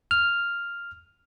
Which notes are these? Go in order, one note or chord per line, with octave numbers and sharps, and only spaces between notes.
F6